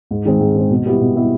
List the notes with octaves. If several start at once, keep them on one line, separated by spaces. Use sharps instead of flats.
G#2
D#3 G#3 C4
G#2
D#3 G#3 C4
B2
G3 B3 E4 G4
B2
G3 B3 E4 G4